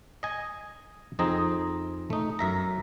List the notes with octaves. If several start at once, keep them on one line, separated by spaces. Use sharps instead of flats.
D#5 G#5
F2 C4 D#4 G#4 A#5
A3 D#4
F#2 E5 A#5